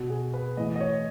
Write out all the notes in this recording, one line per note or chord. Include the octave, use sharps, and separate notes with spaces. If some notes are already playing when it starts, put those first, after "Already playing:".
Already playing: B2 F#4
G#4
B4
A2 E3 D#5
D#5
C#5